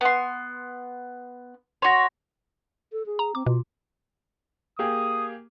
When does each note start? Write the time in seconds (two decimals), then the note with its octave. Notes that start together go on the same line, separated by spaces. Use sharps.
0.01 B3 C6
1.82 F#4 C#5 C6 A#6
2.92 A4
3.06 G#4
3.19 A#5
3.35 C4 D6
3.46 B2 F4
4.79 A#3 G4 G#4 D#6